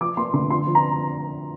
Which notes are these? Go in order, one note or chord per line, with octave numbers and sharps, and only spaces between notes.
F3 D6
A#3 C6
D3 C6
F4 C6
F3
A#5